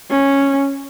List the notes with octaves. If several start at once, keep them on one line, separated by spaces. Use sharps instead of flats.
C#4